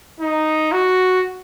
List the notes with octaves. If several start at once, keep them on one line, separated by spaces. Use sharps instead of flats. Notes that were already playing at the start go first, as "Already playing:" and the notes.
D#4
F#4